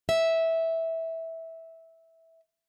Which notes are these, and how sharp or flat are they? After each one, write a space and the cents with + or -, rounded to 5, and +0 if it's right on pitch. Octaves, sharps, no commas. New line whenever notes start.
E5 -15